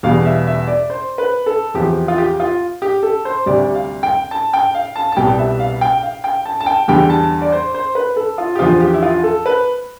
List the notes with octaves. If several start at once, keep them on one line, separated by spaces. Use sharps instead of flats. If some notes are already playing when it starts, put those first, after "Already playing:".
E2 B2 G3 F5
E5
E5
D5
C5
B4
A4
E2 C3 F3 G4
F4
G4
F4
G4
A4
C5
D2 C3 G3 D5
F5
G5
A5
G5
F5
A5
A5
C2 B2 G3 G5
E5
F5
G5
F5
G5
A5
A5
G5
E2 D3 G3 G5
A5
D5
C5
C5
B4
A4
F4
G4
E2 D3 F3 F4
G4
E4
F4
A4
B4